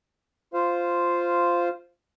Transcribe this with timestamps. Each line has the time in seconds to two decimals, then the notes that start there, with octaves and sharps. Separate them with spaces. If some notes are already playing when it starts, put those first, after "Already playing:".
0.54 F4 C5 F5